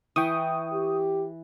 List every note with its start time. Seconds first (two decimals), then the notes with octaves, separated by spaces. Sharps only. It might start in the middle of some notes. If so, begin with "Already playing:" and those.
0.16 E3 G5 C#6 D#6
0.72 G4